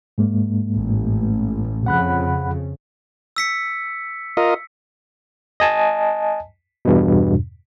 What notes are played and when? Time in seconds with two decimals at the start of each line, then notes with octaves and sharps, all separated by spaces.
0.18 G#2 G#3 A#3
0.75 A1
1.86 F2 C#3 F#5 B5 F#6
3.36 E6 B6 C#7
4.37 F4 A#4 D#5
5.60 D#5 G#5 A5
6.85 E2 G2 B2